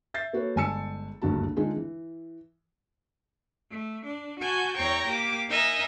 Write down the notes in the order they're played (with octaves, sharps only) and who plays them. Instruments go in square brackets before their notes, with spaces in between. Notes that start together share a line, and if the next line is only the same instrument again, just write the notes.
[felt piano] E5 G6 A6 C7
A#3 F#4 A4 B4 C#5
G1 G#3 G#5 A5 E6 C#7
F#1 D2 G2 F#4 A5
D3 G#3 D4 D#4 F4 G#4
E3
[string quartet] A3
D4
F#4 G#5 A5 G6
E2 C#5 G5 A#5 C#6 G6
A#3 G4 D6
D#4 A#4 D#5 E5 G#5